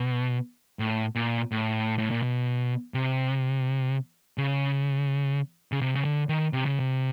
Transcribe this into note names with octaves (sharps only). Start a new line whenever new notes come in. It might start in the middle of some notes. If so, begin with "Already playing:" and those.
Already playing: B2
A2
A#2
A2
A2
A#2
B2
C3
C#3
C#3
C3
C#3
D3
D#3
C3
C#3
C3